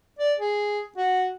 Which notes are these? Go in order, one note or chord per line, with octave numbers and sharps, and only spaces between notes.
D5
G#4
F#4